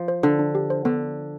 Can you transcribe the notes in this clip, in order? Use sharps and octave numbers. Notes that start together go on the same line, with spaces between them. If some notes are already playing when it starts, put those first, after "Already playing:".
Already playing: F3
C5
D3 D4
D4
G4
C5
D3 B3